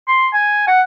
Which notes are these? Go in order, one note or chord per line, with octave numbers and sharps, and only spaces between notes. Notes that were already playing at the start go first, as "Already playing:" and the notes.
C6
G#5
F#5